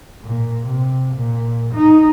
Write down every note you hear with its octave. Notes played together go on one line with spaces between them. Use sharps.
A#2
C3
A#2
D#4